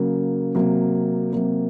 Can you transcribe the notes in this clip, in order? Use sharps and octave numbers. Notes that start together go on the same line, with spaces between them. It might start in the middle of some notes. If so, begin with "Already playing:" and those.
Already playing: C#3 F#3 A#3
C3 F#3 A#3
C3 F#3 A#3